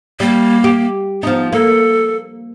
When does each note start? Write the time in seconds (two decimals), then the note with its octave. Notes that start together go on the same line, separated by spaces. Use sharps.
0.20 G3 A#3
0.64 G4
1.23 F3 B3 D#4
1.53 A#3 A4